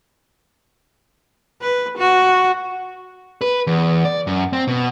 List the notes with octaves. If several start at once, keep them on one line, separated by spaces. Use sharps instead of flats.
B4
F#4
B4
E2
D5
F#2
C4
B2